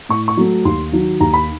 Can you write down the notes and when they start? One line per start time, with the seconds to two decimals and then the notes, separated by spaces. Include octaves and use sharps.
0.09 A2 C#6
0.28 C#6
0.37 F#3 A3
0.65 D#2 C6
0.92 D#3 F#3
1.20 D#2 A#5
1.34 B5